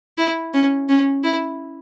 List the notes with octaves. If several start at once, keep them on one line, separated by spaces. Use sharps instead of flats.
E4
C#4
C#4
E4